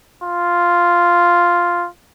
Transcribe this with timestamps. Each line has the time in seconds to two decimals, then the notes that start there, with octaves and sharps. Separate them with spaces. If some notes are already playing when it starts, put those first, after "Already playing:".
0.24 F4